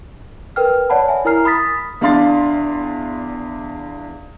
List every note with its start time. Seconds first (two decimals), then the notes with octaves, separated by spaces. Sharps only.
0.56 A#4 B4 G5 F6
0.90 C#5 D5 F#5 A5 B5
1.08 E5 G#5
1.25 E4 A#4 G#5 A#5 F6 C7
1.45 B5 D#6 A6 B6
2.01 E2 D4 F5 C6 A6